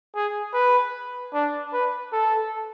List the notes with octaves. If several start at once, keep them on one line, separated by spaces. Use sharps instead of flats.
G#4
B4
D4
B4
A4